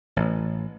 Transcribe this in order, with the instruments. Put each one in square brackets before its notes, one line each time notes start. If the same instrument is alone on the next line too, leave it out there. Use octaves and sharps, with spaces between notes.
[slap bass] A1